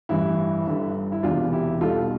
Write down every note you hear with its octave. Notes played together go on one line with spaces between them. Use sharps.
A1 G2 E3 G3 E4
G1 G2 D3 G3
E4
E1 E2 C3 E3 D4 F4
E4 G4
B1 B2 G3 F4 A4